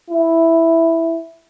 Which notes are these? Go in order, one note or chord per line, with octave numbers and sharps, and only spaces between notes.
E4